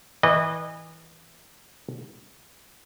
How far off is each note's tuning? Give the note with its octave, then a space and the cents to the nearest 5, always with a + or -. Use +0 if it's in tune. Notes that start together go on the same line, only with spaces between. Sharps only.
E3 -20 D#5 -30